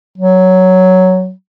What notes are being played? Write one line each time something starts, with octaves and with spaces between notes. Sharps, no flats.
F#3